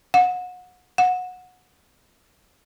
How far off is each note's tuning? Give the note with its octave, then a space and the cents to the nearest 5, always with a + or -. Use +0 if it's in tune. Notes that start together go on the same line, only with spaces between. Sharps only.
F#5 -30
F#5 -20